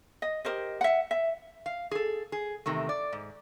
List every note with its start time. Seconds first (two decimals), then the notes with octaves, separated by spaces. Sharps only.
0.22 D#5
0.45 G4 A#4 C5 D#5
0.81 E5 F#5
1.11 E5
1.66 F5
1.91 G#4 A4
2.32 G#4
2.66 E2 C3 D#3 A3
2.89 D5
3.13 G#2